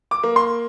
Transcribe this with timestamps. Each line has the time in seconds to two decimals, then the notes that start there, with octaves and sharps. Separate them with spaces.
0.11 D6
0.23 A#3
0.36 C6